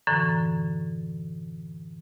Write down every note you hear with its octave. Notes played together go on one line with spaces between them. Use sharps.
F#2 A2 D3 E3